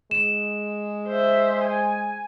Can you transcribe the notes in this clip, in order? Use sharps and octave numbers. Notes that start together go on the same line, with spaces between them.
G#3 E7
C5 E5
G#5